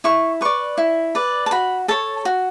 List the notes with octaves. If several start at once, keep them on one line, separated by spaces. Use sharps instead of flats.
E4 C#6
B4 D5 C#6
E4
B4 D5
A5
F#4 B5
A4 C#5 A5
F#4